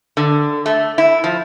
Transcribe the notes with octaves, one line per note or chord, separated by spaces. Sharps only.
D3
A3
E4
F3